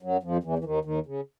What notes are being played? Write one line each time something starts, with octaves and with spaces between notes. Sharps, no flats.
F#2 F#3
F2 F3
E2 E3
E3
D#2 D#3
D#2 D#3
C#3